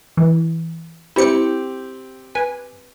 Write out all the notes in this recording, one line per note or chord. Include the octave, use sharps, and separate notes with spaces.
E3
C4 E4 G4 C#7
B4 G#5